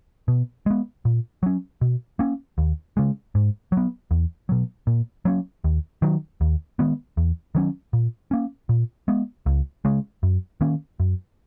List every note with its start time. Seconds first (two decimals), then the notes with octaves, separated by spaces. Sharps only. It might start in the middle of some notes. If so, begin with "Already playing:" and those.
0.28 B2
0.66 G#3 B3
1.05 A#2
1.43 F#3 C#4
1.81 B2
2.19 A#3 C#4
2.58 D#2
2.97 C#3 G#3
3.35 G#2
3.72 F#3
3.77 B3
4.11 E2
4.49 B2 F#3
4.87 A#2
5.25 F#3 A#3 C#4
5.64 D#2
6.02 D#3 F#3
6.41 D#2
6.79 D#3 G#3 B3
7.17 E2
7.55 D#3 F#3 C#4
7.93 A#2
8.31 A#3 C#4
8.69 A#2
9.08 G#3 B3
9.46 C#2
9.85 C#3 G#3
10.23 F#2
10.61 D#3 A#3 C#4
11.00 F#2